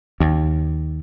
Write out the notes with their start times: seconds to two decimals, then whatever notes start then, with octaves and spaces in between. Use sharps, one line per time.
0.20 D#2